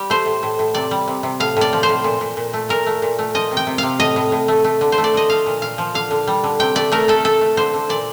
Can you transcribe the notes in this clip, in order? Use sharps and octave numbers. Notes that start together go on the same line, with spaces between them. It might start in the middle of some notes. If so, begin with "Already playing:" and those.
Already playing: G3 G4
A3 C5
A2
A2
A2
C3 D5
G3
C3
C3
A2 F5
A2 D5
F3
C5
A2
A#2
A#2
A#2
A3
A#2 A#4
A3
A#2
A3
F3 D#5
C3
G5
C3
C3 F5
A2 D#5
A2
A2
A3
A3
D3
C5
A3
D5
D3 D#5
F3 F5
A#2
A#2 F5
F3
D3 F5
D3
G3
D3
C3 G5
A3 D5
A3 A#4
A3 A4
A3 A4
A3
D3 C5
D3
A#2 D5